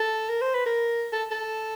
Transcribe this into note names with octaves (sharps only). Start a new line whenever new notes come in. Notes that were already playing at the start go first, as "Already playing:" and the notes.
Already playing: A4
A#4
C5
B4
A#4
A4
A4